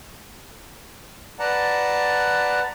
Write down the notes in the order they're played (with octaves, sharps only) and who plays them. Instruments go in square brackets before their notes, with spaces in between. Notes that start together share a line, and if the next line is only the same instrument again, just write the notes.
[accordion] B4 D5 F#5 A5 A#5